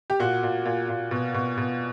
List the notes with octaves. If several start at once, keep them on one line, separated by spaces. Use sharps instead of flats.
G4
A#2 F#4
A#2
A#2
A#2
B2
B2
B2